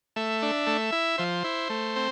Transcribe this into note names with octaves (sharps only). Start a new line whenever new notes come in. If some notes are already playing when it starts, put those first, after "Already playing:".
A3 E5
D4
A3
E4
F3 C5
E4
A3
C4